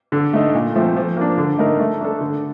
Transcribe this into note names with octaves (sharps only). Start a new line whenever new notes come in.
D3
A3 D#4
A#2
F3 A3 C4
F3
A#3 D4
D3
A3 D#4 A#4
A3
D4 A4
D3